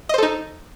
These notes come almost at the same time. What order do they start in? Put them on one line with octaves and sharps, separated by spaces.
D#5 C5 A4 D#4